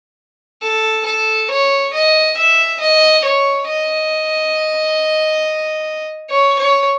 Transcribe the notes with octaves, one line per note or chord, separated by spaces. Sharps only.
A4
A4
C#5
D#5
E5
D#5
C#5
D#5
C#5
C#5